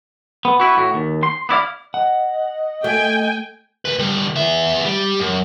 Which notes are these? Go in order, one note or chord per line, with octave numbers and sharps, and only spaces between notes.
B3
B3 E4 F#4
A2 F#4
D#2
C6
B3 E4 D5 F5
D#5 F#5
A3 G5 G#5
D2 B4
D3 G3
B3 E5
G3
F#2